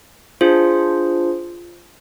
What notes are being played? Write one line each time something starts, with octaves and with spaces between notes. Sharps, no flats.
D4 F4 G#4 C5